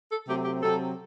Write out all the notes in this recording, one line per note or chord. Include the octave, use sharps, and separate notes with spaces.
A4
C3 F#3 A3 C4 G4
G4
C3 F#3 C4 A4